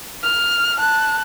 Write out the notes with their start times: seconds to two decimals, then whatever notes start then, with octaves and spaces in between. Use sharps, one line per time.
0.23 F6
0.79 A5 F#6